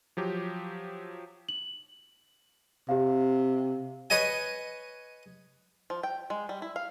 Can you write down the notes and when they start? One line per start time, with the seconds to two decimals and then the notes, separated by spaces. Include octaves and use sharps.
0.17 F3 F#3 G4
1.49 F#7
2.89 C3 G4 F5
4.10 B4 C#5 D#5 G#5
5.90 F3
6.03 G5
6.30 G#3
6.49 G3
6.62 E4
6.76 F5